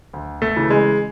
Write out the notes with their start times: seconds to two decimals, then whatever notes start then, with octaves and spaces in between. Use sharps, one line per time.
0.13 D2
0.42 A3
0.56 C#3 E3
0.70 G#3